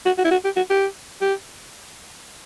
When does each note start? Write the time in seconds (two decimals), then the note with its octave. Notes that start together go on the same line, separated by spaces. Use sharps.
0.06 F#4
0.18 F#4
0.25 E4
0.31 F#4
0.45 G4
0.57 F#4
0.71 G4
1.22 G4